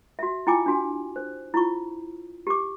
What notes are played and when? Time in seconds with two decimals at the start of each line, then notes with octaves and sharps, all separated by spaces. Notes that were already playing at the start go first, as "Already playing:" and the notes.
0.19 F#4 E5
0.47 E4 F4 G5 G#5 D6
0.66 D4 F#4 G#5
1.16 C5
1.54 E4 F4 C#6
2.47 G4 D6